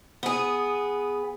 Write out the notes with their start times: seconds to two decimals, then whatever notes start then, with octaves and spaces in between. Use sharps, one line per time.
0.23 B3 G#4